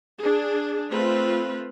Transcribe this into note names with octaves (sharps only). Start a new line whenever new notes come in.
D4 G#4
A3 C4 F4 B4